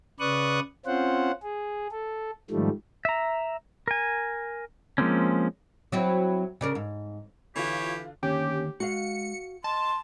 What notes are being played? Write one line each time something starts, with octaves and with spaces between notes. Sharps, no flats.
C#3 B4 D5 C#6 D#6 F#6
C4 C#4 F4 C5 F#5
G#4
A4
G#2 D#3 F3 G3 A3
E5 A#5
A#4 G#5
F3 G#3 A#3 C4 C#4
F#3 C4 E4
C#3 D4 A#4
G#2
D3 E3 F4 G4 C#5
D3 D#3 A#3 C#4 G4
G#3 F#4 F5 C#7
D#5 A5 C6